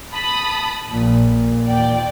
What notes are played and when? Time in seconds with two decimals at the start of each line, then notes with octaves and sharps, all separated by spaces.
0.13 A5 B5 D#6
0.89 A#1 A#2
1.67 D#2 D5 G5